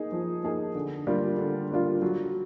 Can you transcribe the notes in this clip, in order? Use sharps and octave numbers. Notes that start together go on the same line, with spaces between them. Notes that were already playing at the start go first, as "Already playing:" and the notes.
Already playing: A#3 D#4 G#4
F3
A#3 D#4 G#4
D3
G3 A#3 D4 F4
D3
G3 A#3 D4 F4
F#3